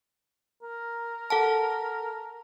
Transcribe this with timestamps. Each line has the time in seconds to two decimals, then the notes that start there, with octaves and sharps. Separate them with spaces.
0.63 A#4
1.30 A4 F#5 A5